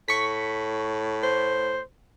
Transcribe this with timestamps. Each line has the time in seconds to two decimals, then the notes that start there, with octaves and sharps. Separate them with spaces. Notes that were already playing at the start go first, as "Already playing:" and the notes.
0.08 A2 C#6 B6
1.23 C5